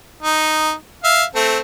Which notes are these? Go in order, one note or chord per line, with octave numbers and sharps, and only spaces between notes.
D#4
E5 F5
A3 C4